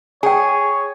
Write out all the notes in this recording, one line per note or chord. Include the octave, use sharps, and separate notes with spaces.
G#4 C#5 G5 G#5